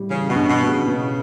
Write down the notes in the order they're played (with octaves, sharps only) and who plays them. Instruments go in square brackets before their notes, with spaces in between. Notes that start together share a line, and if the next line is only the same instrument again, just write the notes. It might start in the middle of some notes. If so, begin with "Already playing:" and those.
Already playing: [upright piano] A2 G3
[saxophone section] C#3 [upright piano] E3
[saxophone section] B2
[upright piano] G2
[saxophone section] B2
[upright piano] B3
[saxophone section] C#3
[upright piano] B2